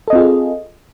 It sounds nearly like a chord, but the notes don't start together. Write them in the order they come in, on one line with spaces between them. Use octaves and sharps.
A4 D#5 C4 F4 G#4